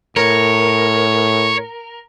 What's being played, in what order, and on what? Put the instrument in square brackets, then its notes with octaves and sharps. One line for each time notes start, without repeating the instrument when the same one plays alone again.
[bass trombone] A2 [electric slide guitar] A#4 [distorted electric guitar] C#5